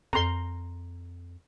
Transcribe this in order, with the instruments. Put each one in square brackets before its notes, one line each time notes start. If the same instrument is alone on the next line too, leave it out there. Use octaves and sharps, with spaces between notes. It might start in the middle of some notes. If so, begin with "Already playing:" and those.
[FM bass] F2 [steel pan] A#5 C6